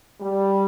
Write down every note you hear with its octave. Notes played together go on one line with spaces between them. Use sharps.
G3